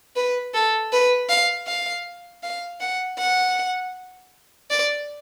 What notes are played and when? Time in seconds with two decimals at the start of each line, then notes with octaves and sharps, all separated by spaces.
0.16 B4
0.54 A4
0.93 B4
1.29 F5
1.67 F5
2.43 F5
2.81 F#5
3.19 F#5
4.70 D5